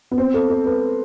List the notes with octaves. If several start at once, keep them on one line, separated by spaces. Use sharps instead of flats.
B3
C4
A4
A4
B4